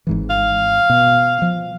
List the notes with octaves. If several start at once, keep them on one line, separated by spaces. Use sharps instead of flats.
G#1 G#2 E3
F5
B2
F3